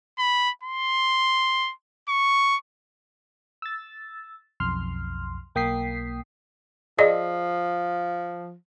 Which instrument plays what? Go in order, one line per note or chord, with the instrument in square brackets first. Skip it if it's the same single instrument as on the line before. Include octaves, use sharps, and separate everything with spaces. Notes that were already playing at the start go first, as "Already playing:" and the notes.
[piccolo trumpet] B5
C6
C#6
[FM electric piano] E6 A6
B1 F2 C6 F6
B1 A#3 G5 D#6 B6 C7
[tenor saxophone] F3 [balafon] G#4 D5 D#5